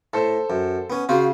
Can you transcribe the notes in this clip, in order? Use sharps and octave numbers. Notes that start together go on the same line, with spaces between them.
A2 A4 C5
F#2
B3 C#4
C#3 F4 F#4 C5